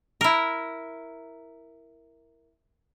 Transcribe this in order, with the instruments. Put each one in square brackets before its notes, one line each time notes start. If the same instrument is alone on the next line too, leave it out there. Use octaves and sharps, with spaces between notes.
[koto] E4 A#4